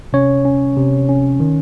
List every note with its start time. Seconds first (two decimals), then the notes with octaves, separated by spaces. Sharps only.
0.13 C3 C#4 C#5
0.45 C#4
0.77 C3
1.09 C#4
1.40 D#3